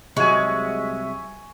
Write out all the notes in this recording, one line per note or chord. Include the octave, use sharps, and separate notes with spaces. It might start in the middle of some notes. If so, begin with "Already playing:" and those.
C2 F#3 G#3 E5 G#5 C#6